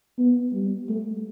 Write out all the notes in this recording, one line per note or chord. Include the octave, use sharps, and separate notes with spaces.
B3
G3
A3